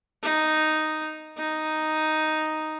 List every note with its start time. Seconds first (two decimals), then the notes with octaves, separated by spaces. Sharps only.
0.23 D#4
1.38 D#4